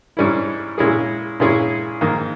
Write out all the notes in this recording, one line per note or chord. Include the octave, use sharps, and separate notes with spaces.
G#2 G3 C#4 E4
A#2 G#3 C#4 E4 G#4
A#2 G#3 C#4 E4 G#4
G#2 D#3 A#3